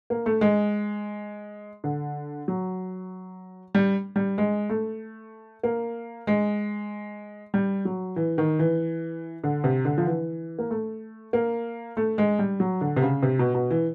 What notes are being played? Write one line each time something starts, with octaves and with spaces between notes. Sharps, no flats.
A#3
A3
G#3
D3
F#3
G3
G3
G#3
A3
A#3
G#3
G3
F#3
E3
D#3
E3
D3
C3
D3
F3
E3
A#3
A3
A#3
A3
G#3
G3
F#3
D3
C3
C#3
C3
B2
B2
E3